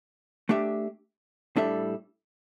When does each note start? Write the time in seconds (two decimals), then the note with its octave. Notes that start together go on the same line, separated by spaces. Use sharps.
0.49 A3 D4 G4 E5
1.56 A2 G3 D4 A4 E5